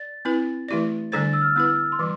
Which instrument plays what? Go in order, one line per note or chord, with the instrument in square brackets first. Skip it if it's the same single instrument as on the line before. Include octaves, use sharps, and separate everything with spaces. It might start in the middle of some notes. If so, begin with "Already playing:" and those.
Already playing: [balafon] D5 [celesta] A6
[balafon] C4 E4 B4
E3 A3 E4 G4 D5
[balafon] D3 G3 D4 A4 C5 [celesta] A6
[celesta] E6
F6
[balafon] B3 E4 B4 [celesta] E6
[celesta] C6
[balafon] E3 G3 [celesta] D6